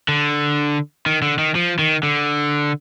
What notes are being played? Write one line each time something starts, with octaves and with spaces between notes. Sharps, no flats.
D3
D#3
D3
D#3
F3
D#3
D3